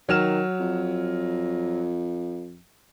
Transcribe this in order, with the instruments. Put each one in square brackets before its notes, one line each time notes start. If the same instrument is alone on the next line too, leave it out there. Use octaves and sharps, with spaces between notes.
[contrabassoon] D#3 [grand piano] F#3 F6 E7
[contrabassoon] F2